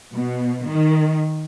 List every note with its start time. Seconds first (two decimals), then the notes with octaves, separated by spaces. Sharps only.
0.15 B2
0.67 D#3